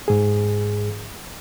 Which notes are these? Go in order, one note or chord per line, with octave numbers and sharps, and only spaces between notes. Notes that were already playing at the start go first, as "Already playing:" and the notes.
G#2 G#4